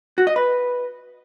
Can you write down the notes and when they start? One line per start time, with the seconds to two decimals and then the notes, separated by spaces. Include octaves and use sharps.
0.18 F#4
0.27 D#5
0.36 B4